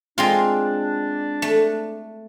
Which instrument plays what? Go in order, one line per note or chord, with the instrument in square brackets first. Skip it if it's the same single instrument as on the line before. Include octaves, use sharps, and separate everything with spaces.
[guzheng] G#3 C4 F4 [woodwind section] D4
[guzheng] A3